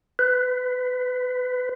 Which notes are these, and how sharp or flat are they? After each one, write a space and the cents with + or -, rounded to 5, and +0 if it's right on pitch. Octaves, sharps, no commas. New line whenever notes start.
B4 +25